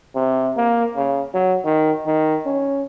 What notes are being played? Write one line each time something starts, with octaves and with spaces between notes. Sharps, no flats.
C3
A#3
C#3
F#3
D#3
D#3
C#4